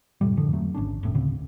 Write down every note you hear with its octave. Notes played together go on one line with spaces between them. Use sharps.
F2 A2 C3 G3
F#2 A2 D3 F3
F2 F#3 A3
G#1 C#4 D4
F1 A2
D2 A2 C#3 C4